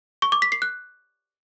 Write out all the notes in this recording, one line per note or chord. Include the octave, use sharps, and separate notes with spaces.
C#6
D6
B6
C7
F#6